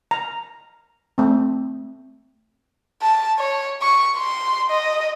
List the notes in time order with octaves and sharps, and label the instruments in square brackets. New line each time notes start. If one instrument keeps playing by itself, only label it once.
[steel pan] A#5
A3 C4
[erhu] A5
C#5
C#6
C6
D#5